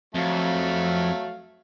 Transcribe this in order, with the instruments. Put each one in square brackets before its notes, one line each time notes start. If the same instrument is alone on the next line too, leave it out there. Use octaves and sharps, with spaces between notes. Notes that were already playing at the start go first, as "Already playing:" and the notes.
[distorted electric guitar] F2 [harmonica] F#3 A3 F5